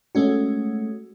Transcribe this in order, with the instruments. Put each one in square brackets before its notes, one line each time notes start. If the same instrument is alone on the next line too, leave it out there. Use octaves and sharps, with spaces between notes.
[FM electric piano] G#3 A3 C#4 F#4